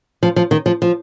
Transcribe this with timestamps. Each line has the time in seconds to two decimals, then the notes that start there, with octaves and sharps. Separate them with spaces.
0.23 F3
0.36 F3
0.51 D#3
0.66 F3
0.82 F3